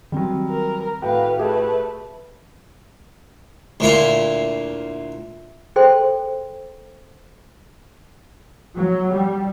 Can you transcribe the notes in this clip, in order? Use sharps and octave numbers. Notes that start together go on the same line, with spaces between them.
D#3 F#3 G3 C4
A#4
A2 F#4 B4 F5 G5
A3 G4 G#4 B4 E5
D2 A#2 E4 F4
G#4 A4 C5 G5 C6
F#3
G3